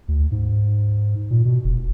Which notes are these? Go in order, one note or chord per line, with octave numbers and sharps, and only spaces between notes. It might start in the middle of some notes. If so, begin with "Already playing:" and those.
D2
G#2
A#2
B2
F1